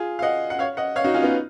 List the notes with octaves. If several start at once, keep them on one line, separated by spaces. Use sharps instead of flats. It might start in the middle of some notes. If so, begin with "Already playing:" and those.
Already playing: F4 G#4
F5
D#5 F#5
F#5
C#5 F5
D#5 F#5
C#5 F5
D#4 F#4
C#4 F4
B3 D#4